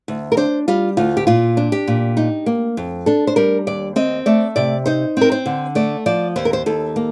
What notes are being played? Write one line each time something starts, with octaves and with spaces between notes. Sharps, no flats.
D2
A#4
D4 C5
G3 F4
D2 F4
G4
A#2 F4
D4
G4
A#2
D#4
A#3
F2
D4 A4
C5
G3 A#4
D#2 D5
C4 D#5
A3 D5
C3 D5
D#4 C5
C4 A#4
C5
D3
A3 D5
F3 D5
D#2 C5
A#4
C5
D#2 A4
A#3